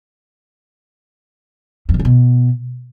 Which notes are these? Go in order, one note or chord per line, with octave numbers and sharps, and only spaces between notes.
F2
B2
C#3
B2